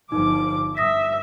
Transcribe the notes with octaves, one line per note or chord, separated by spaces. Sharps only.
G1 F3 D#4 D6
G2 E5 D#6 A#6 B6